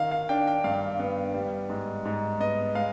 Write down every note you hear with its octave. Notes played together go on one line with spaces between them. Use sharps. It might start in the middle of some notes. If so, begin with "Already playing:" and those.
Already playing: D#3 F5
F5
D4 G5
G5
G2 F5
B3
G3
G#2
G#2
B3 D#5
G#3 F5